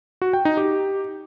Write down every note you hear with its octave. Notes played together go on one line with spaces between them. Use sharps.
F#4
G5
D#4
G4